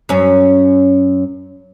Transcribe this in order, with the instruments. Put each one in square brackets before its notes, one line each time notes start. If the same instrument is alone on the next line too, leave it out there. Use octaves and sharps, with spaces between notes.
[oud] F#2 C#4